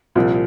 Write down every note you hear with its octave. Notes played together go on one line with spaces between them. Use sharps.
C2 A#2 F3